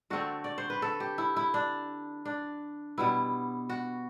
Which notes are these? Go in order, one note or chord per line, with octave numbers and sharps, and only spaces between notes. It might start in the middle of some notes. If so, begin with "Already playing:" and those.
D3 A3 C4 F#4
D5
C5
B4
A4
G4
E4
E4
D4
D4
B2 G3 B3 E4
F#4